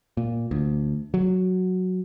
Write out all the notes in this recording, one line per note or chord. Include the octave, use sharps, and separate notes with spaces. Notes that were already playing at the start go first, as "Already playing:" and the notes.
A#2
D2
F#3